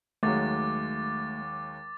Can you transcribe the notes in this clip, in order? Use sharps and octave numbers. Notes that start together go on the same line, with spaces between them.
D#2 F#3 G#3 A3 D6 A6